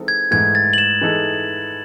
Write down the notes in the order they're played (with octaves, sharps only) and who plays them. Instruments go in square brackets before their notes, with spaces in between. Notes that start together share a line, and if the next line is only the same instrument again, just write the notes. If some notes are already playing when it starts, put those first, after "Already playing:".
Already playing: [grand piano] E3 G#3 C4 D#4 A4
[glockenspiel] G#6
[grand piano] G#2 E3 A3 [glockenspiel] G#6
[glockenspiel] A6
F#7
E7
[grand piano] E3 G#3 D#4 A4